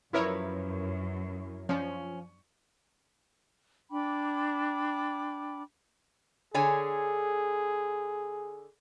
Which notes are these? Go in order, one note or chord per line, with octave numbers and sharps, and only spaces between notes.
F#2 F3 E4 A#4 B4 C#5 E5
F3 C#4
D4 G5 B5 D6
D3 G#4 C#5 G#5